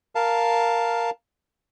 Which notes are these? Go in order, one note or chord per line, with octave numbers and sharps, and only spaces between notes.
A#4 F5 A5